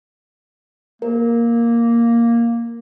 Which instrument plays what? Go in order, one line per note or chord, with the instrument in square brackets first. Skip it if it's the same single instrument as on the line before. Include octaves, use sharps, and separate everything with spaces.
[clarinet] A#3 [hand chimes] A#4